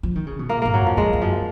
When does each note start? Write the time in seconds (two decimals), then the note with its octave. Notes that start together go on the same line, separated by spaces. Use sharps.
0.03 F3
0.15 D#3
0.27 C#3
0.39 B2
0.49 A#2 A#3
0.62 G#2 A#3
0.74 F#3
0.82 F2 F3
0.97 F2 G#3
1.13 F2
1.21 F#2 F3